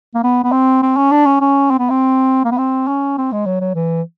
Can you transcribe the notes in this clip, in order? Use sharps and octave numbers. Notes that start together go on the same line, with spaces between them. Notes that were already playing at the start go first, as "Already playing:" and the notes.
A#3
B3
B3
C4
C4
C#4
D4
C#4
C#4
C4
B3
C4
A#3
B3
C4
C#4
C4
G#3
F#3
F#3
E3